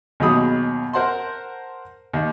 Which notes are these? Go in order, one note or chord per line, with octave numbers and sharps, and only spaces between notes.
D#2 B2 F#3 G#4 B5 D#6
A#4 C5 F#5 A5 C6
D#2